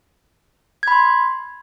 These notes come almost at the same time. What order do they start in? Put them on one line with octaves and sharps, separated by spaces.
G#6 B5 C6